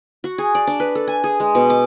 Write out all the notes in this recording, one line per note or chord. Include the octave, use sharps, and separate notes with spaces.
F#4
G#4
D5
D4
B4
A4
G#5
G#4
G#3
B2
D6